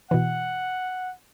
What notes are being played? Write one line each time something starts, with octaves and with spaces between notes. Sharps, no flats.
B2 E3 F#5